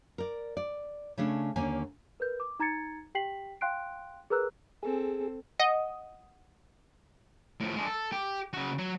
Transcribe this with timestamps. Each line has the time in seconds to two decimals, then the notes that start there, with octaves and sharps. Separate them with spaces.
0.18 A#4 D5
0.57 D5
1.18 C#3 A3 C#4 D4
1.56 D#2 D3 A#3 C#4 G#5
2.20 A#4 B4 G6
2.40 D6
2.60 D#4 A#5 G#6 A6 C#7
3.15 G4 G5 B6 C7 F#7
3.61 F5 G5 C6 F#6 C7 D7
4.30 G#4 A#4 B4 A#5 E6 F#6
4.83 C4 G#4 A4
5.60 D#5 F#5
7.60 A2 F3
7.75 G#3 D4
7.87 A4
8.12 G4
8.53 C#3 F#4
8.78 F#3